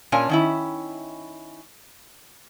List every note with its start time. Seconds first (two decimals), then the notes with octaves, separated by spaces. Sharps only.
0.12 A#2 C#4 D4 G#5
0.29 D#3 C#4 E4